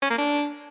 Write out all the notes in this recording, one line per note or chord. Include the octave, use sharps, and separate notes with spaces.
C#4
A#3
D4